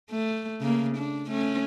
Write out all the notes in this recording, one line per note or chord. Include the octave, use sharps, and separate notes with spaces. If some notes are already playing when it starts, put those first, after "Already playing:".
A3
C#3 A#3
D4
A3 C#4